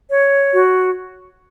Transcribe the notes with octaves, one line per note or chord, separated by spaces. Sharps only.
C#5
F#4